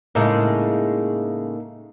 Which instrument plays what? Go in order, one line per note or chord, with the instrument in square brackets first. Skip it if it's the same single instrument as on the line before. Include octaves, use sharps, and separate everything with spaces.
[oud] A2 C#3 G#3 [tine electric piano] A#3 D#4 A4